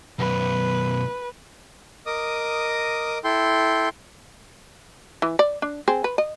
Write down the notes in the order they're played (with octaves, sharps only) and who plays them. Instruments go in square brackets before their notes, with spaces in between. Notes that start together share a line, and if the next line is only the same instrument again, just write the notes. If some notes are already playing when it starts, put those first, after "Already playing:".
[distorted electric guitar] B1 F#2 [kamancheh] B4
[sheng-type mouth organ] A#4 D#5 D6 D#6
E4 A4 G5 C6
[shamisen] E3
D5
D4
C4 G#4
B4
D#5